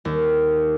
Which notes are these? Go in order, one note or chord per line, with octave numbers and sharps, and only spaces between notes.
D#2